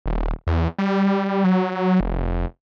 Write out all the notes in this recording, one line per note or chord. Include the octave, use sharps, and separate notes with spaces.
D#1
E2
G3
F#3
F1